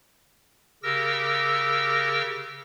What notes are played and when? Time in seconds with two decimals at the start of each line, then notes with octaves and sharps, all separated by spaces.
0.83 C#3 G4 A#4 E6 A#6